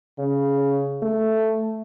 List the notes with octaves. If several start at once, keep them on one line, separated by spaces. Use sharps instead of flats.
C#3
A3